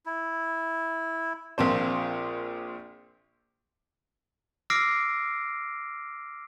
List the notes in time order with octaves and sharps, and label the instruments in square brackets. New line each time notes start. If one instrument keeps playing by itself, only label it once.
[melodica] E4
[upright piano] A#1 A#2 C4 C5
[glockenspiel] D6 E6 F6 A#6 C7 D7